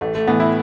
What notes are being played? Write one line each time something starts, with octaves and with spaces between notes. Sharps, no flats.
A1 A3
A3
A2 E3 B3
E4